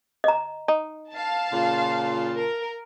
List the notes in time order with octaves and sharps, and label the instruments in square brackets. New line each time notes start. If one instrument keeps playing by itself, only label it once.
[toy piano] D#5 A#5
[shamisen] D#4
[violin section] F5 A5
[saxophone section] A#2 C#3 F4
[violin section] A#4